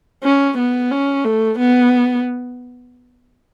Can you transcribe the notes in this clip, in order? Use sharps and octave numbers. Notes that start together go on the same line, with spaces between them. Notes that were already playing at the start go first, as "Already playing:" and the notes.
C#4
B3
C#4
A3
B3